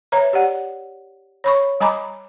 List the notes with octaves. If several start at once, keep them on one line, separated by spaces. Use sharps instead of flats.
B4 C#5 E5 A#5
G4 D5 F#5
C#5 B5 C#6
G3 G#5 A#5 B5 D6